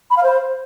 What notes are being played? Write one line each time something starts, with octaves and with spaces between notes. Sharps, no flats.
B5
F5
C5